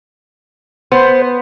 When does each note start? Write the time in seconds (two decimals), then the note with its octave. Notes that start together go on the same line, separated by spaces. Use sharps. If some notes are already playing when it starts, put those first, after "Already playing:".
0.92 B3 C5